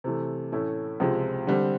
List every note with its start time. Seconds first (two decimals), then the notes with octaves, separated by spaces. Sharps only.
0.04 C3 E3 A3
0.52 A2 E3 A3 C#4 E4
1.00 C#2 C3 F3 G#3
1.47 D3 G3 C4